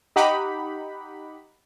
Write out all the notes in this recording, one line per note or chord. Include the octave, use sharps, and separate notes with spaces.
D#4 G4 F#5 B5